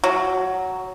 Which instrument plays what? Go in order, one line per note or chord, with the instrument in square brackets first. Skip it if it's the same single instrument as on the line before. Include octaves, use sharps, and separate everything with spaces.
[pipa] F#3